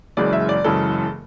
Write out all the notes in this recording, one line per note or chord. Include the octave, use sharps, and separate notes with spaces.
F#1 F#2 C#3 E3 G#3 D5
E5
D5
F#1 F#2 C#3 E3 G#3 A4